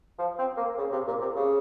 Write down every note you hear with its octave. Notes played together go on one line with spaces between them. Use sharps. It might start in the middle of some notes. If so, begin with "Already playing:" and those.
F3
C4
A#3
C#3
C3
A#2
C3
C#3